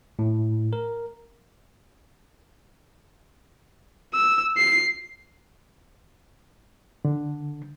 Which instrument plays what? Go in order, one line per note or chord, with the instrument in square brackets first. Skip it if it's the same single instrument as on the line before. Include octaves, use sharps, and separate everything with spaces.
[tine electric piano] A2
A#4
[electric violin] E6
C7
[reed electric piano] D3